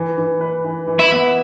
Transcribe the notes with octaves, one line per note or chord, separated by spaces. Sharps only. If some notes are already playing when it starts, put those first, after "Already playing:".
Already playing: E3
E3
B4
E3
E3
E4
B3